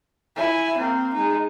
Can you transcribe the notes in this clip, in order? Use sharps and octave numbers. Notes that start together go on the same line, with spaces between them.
E4 G#5
A#3 C4
G#3 D#4